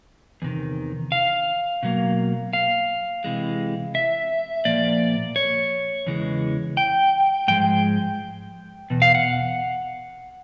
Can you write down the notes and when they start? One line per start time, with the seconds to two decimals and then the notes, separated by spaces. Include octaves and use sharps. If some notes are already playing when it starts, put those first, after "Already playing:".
0.42 E2 C3 D#3
1.12 F5
1.83 B2 F#3 A#3
2.53 F5
3.24 C3 E3 G#3
3.95 E5
4.65 A#2 F3 A#3 D5
5.36 C#5
6.06 E2 C#3 E3 G#3
6.77 G5
7.48 G#2 F3 G#3 G5
8.90 E2 B2
9.02 F5
9.15 F#5